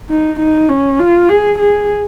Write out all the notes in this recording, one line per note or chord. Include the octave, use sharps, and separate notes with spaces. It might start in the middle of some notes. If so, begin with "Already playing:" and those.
D#4
D#4
C#4
F4
G#4
G#4